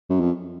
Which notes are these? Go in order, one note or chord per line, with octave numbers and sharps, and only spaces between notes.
F#2
F2